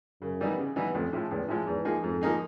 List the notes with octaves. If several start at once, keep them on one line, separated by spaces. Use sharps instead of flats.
F#2 C#3
E3 G3 B3 D#4
C#3
E3 G3 B3 D#4
A1 F2
A2 F3 G#3
A1 E2
A2 F3 G#3
E2 G#2
F3 A#3 D#4 G#4
F2 G#2
F3 A#3 D#4 G#4